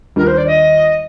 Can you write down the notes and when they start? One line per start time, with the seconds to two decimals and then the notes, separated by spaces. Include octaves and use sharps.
0.16 D#2 D#3 G3 D4 F4 A#4
0.27 C5
0.37 D5
0.46 D#5